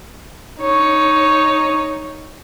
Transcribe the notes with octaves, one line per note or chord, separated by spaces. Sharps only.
D#4 C#5